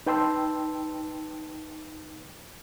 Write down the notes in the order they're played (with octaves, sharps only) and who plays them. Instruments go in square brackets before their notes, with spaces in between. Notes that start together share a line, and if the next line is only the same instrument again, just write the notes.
[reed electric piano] D#4 B4 G5 A5 C6 E6